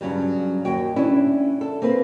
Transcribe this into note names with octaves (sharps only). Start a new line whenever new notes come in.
G2 C#3 F#3 G3
D#2 F#4 G5
C#4 D4 E4
A4
A#3 C4 F4 B4